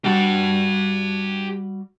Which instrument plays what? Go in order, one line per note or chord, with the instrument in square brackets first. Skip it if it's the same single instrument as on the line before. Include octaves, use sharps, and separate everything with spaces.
[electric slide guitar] G3 F#4 [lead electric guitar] G4 A5